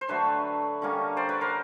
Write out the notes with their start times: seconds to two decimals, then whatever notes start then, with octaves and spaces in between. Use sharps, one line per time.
0.01 C5
0.08 D3 F#3 A3 B4 C#5
0.82 D3 G3 A#3 C#4
1.17 C5 D5
1.29 B4 C#5
1.41 A#4 C5